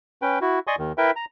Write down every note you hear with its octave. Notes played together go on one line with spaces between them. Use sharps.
C#4 B4 G5
E4 F#4
D5 D#5 G#5 C6 C#6 D#6
D#2 D#3
E4 A#4 B4 E5 G5
A#5